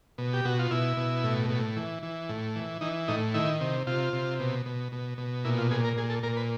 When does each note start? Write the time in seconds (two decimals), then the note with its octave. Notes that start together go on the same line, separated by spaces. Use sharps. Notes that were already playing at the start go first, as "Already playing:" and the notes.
0.18 B2
0.33 G4
0.45 B2 F#4
0.59 F4
0.71 B2 E4
0.97 B2
1.24 A2
1.50 A2
1.77 E3
2.03 E3
2.29 A2
2.56 E3
2.81 E3 D#4
3.08 A2 D#4
3.34 D#3 E4
3.61 C3
3.87 C3 F4
4.13 C3
4.40 B2
4.66 B2
4.92 B2
5.18 B2
5.44 A#2 E4
5.58 F4
5.71 A#2 G#4
5.84 A#4
5.97 A#2 G#4
6.10 A4
6.23 A#2 A#4
6.37 B4